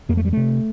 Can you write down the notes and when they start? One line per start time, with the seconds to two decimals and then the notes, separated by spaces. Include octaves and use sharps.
0.09 F2 A#3
0.17 A3
0.25 G3
0.33 C3 A3